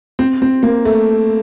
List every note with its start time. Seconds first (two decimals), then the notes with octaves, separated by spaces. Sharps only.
0.19 C4
0.42 C4
0.63 A#3
0.85 A3